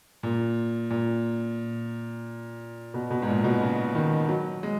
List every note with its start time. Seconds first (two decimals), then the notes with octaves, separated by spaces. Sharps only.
0.23 A#2
0.90 A#2
2.94 B2
3.11 B2
3.22 G#2
3.28 A#2
3.44 B2
3.61 C#3
3.95 D#3
4.29 F#3
4.63 G#3